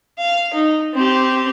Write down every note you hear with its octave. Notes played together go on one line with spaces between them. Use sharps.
F5
D#4
C4 G4